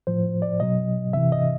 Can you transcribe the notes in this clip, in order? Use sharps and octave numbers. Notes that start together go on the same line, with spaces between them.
A2 F3 C5
D5
B2 F#3 D#5
C3 E3 E5
D#5